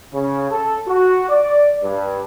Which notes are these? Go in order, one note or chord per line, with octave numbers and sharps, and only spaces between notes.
C#3
A4
F#4
D5
G2